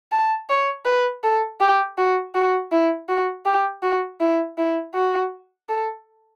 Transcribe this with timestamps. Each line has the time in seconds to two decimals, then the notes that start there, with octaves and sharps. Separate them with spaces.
0.12 A5
0.50 C#5
0.86 B4
1.24 A4
1.61 G4
1.98 F#4
2.35 F#4
2.72 E4
3.09 F#4
3.46 G4
3.83 F#4
4.21 E4
4.58 E4
4.95 F#4
5.69 A4